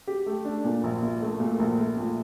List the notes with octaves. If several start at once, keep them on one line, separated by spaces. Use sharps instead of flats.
G4
A3
D4
A#2
A#1
A#2
A3
A#2
A#1
A3
A#2